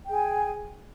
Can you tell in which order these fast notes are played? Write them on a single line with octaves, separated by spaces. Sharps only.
G5 G#4 G#5